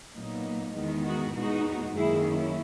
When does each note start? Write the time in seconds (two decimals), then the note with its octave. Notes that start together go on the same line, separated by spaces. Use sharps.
0.14 A#2 F#3 A#3 B3 D#4
0.75 E2 D#3 G#3 B3
1.05 D#4 F#4
1.34 E2 B2 G#3 B3 D#4 F#4
1.95 F#2 D#3 A#3 E4 G#4
2.26 C#4 E4